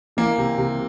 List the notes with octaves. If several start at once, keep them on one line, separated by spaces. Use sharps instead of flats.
E3 A#3
C3
C3